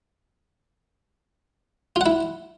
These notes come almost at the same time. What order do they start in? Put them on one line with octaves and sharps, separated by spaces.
F4 F#5 E4